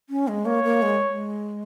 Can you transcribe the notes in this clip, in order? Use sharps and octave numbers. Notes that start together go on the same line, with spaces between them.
C#4
G#3
A#3 C#5
A#3
G#3
G#3